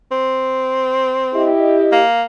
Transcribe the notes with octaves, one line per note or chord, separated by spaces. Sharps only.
C4
E4 G4 D#5
A#3